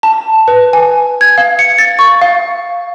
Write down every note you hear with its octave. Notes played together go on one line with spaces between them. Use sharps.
A5
B4
G#5
G#6
F5
C#7
A6
C#6
F5